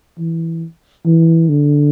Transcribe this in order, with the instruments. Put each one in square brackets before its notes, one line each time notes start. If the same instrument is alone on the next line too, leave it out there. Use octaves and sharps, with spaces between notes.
[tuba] E3
E3
D3